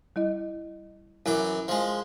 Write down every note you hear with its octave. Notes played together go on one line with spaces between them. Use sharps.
G3 E4 D#5
F#2 E3 E4 D6
F3 G#3